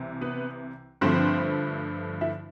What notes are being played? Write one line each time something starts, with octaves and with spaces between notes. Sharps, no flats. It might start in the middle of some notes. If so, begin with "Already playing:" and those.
Already playing: C2 C3 E3
B3 B4
G2 D3 F3 A3 C4 C5
E4 E5